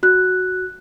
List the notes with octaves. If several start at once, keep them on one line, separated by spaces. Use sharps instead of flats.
F#4 F#6